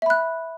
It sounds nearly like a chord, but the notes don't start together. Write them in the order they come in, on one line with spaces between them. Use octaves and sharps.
E5 B5 F#6